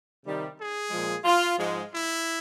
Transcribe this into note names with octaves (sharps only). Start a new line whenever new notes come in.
C3 D#3 G3
G#4
A#2 F3 G#3
F4
G#2 F3 G#3
E4